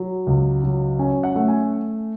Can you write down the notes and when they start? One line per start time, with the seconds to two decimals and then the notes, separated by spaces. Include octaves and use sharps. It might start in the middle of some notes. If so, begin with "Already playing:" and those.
Already playing: F#3
0.27 C#2
0.63 F#3
0.99 C#4 G#5
1.23 F#5
1.36 A3
1.48 G#5